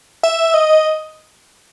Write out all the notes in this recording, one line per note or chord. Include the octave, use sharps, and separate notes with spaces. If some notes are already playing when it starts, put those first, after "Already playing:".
E5
D#5